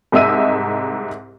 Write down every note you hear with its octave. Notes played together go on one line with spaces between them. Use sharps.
C2 G#2 D#5 E5 E6 D#7